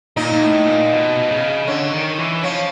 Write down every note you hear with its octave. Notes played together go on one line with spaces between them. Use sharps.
A#2 D#4
A#2
A2
A#2
B2
C#3
D3 C#4
D#3
E3
F3 C#4